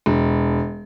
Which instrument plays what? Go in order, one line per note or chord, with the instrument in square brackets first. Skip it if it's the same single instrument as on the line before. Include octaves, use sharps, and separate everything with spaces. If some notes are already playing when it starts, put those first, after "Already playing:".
[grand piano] E1